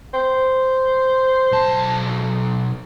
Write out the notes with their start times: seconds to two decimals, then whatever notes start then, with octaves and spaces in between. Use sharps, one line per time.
0.14 C5
1.52 B1 A5